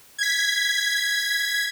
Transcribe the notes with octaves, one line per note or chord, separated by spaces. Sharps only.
G#6 B6